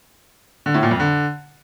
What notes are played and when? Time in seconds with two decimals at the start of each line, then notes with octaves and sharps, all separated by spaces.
0.66 D3
0.74 A2
0.83 A#2
0.91 F2
1.00 D3